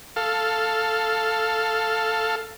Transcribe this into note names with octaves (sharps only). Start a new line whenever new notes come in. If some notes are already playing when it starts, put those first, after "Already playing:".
A4 F5